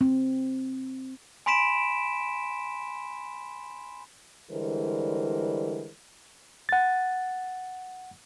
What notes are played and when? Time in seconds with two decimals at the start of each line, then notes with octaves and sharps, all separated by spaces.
0.01 C4
1.46 G#5 B5 C6 B6 D7 E7
4.51 D3 E3 G3 G#3 A#4 C5
6.69 F#5 A6